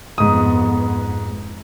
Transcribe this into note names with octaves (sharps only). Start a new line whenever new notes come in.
F2 G#2 B3 D#6